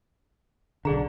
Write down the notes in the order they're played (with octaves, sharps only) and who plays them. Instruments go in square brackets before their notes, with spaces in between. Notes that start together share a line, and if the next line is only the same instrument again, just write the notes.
[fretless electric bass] B1 D3 [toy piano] G#4 A#5